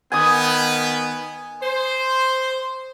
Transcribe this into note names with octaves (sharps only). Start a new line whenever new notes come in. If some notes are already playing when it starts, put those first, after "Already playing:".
D#3 B3 G#5 D#6
C5